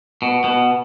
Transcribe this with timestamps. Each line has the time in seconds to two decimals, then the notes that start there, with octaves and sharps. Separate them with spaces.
0.22 B2
0.44 B2